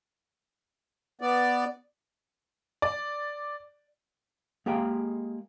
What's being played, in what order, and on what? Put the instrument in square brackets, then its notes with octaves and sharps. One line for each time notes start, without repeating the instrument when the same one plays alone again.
[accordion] B3 D5
[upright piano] D5
[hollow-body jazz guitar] G#3 A#3 G4 G#4 F5 G5